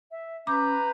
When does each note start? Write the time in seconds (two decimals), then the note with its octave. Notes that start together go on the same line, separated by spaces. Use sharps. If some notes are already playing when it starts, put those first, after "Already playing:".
0.11 E5
0.47 C#4 B4 A#5 D6 G6